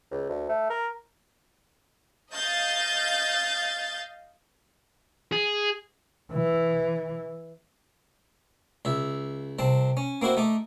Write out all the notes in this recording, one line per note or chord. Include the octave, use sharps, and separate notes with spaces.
C#2
D2
A3
A#4
D#5 F5 G6 A6
G#4
E3
C#2 E5
C2 C4 A5
C#4
A#3 C4 E4 F#4 C5
A3 D#4 D6